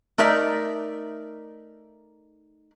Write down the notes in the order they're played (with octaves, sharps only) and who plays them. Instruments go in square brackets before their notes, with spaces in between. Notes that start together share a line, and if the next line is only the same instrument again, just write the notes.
[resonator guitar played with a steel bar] A3 D#4 A#4 D5 E5